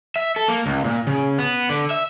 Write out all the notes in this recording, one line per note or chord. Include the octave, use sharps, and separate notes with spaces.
E5
A4
A#3
C#2
A#2
C#3
B3
D3
E5